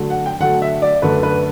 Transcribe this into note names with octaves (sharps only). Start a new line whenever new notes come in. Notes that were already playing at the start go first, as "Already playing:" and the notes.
Already playing: D3 F#3 A3
F#5
G5
D3 F#3 A3 F#5
E5
D5
F#2 D3 F#3 A3 B4
B4